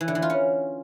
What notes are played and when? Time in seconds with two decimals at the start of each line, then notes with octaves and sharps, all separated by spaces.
0.01 E3
0.08 D3
0.15 E3
0.22 F4
0.30 C#4